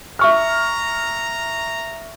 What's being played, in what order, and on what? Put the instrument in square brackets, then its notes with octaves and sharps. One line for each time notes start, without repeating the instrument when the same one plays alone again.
[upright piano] E5 C#6 F6 [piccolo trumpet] A#5